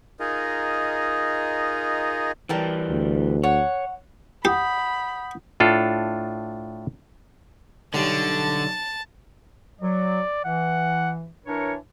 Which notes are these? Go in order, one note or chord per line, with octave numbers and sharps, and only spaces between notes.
D#4 F4 G#4 A#4 D#5
E3 G3 A#4 G5 A5
D2
C#5 F#5
G4 F#5 B5 D#6 G6
A2 D4 F4 A4
B1 D3 F#3 G3 A5
F#3 D5
E3 F#5
E3 D4 A#4 C#5